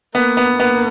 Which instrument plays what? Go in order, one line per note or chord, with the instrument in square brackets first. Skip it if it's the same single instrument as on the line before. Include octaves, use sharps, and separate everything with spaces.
[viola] A#3 [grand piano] B3
[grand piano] B3
[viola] A#3 [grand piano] B3